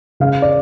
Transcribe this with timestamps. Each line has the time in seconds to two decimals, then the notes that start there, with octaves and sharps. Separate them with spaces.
0.20 C#3 F5
0.42 D5